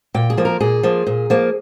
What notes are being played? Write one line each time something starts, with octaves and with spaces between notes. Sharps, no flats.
A#2 G5
G#4
F3 A#3
A#4
A#2 G#4
F3 A#3
A#2
F3 A#3